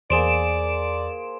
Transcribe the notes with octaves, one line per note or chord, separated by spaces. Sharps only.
E2 A#3 G#4 C5 D5 D7 E7